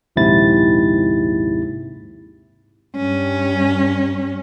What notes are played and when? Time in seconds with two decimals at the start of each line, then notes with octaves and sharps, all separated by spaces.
0.16 A#1 D#2 G#2 C3 E4 A6
2.96 G2 C#4